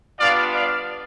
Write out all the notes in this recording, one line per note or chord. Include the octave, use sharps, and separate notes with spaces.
G3 B3 D4 F4 D5 F5
D5 F5